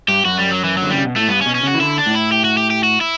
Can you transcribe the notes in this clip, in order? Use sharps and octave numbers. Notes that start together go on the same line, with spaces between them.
G2 G4
F#2 F#4
G3
F#3
E3
D3 F#3
C#3 G3
B2
A2 A3
G2 B3
C#4
B2
C#4
C#3 F#4
E3
D3 E4
D4
A2
E4
G4
F#4
G4
G4
F#4
E4